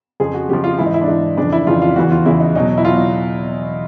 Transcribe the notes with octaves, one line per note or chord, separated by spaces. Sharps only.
F2 C#3 F3 G#4
F#4
F2 C#3 F3 G4
F4
G#2 E3 E4
D#4
E4
D4
G#2 E3 D#4
F2 C#3 E3 D4
E4
F2 C#3 E3 F4
F4
E2 C#3 E3 F#4
F4
E2 C#3 E3 E4
D#4
E2 B2 F#3 D#4
E4
B2 F#3 F4